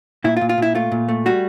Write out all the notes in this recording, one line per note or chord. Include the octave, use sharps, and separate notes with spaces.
A#2 E4
F4
A#2
F4
A#2 E4
A3 F4
A#2
A3
G3 F#4